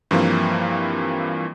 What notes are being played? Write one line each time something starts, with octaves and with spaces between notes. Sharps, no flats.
G2 E3 F3 A#3 C4